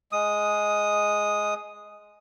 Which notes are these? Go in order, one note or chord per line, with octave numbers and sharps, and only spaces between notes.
G#3 D#6